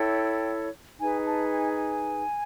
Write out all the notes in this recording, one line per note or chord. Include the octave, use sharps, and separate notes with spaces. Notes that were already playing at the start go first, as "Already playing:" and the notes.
Already playing: E4 A4 C#5 G5
D#4 G#4 B4 G#5
A5
G#5
G#5